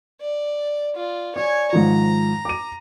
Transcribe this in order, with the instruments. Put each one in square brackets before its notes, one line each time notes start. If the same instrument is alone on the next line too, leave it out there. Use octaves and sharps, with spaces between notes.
[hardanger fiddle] D5
F4 D5
[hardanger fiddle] C#5 G#5 [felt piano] D5
[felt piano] G#2 D#3 F3 [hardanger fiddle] A#5
[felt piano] D6 D#7